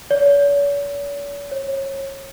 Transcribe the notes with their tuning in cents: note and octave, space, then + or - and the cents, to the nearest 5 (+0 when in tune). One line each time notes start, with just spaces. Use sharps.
C#5 +45
C#5 -25